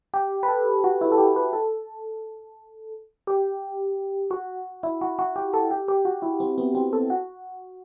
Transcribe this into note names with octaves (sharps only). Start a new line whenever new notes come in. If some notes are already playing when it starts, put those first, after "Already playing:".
G4
B4
A4
F#4
E4
A4
G4
B4
A4
G4
F#4
E4
F#4
F#4
G4
A4
G4
G4
F#4
E4
C4
B3
C4
A4
F#4